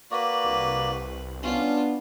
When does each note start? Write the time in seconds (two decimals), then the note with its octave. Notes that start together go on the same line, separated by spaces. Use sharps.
0.11 A#3 F#4 B4 D5
0.45 C2
1.43 B3 C#4 D4 F4